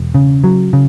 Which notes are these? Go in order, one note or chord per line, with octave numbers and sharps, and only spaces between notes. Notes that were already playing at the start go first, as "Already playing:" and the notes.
Already playing: E1
C#3
F#3
C#3